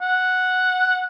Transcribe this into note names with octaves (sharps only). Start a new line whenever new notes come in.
F#5